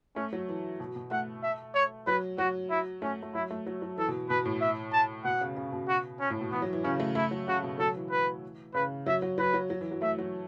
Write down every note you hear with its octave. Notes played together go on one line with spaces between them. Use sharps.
A3 C#4
F#3
E3
B2
B2
A3 F#5
E5
C#5
F#3 B4
F#3 F#4
E4
A3 C#4
A3
F#3 E4
A3
F#3
F#3
E3 A4
B2
B2 B4
A2
E5
A5
B2 F#5
C#3
C#3
B2
F#4
C#4
A2
B2
E3 B3
F#3
E3
C#3 C#4
A3
A3 E4
F#3
C#3 F#4
B2
F#3 A4
E3
B4
C#3 B4
F#3 E5
F#3
F#3 B4
F#3
F#3
E3
F#3
A3 E5
F#3